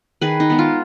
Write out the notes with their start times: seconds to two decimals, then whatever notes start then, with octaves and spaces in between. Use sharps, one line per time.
0.22 D#3 G#4 B4
0.40 D#4
0.50 G#3 B3
0.59 F4